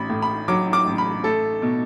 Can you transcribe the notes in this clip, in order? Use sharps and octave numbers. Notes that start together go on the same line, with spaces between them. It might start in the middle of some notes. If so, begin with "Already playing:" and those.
Already playing: A1 B5
A2
B5
F#3 D6
D6
A1
B5
A3 A4
B2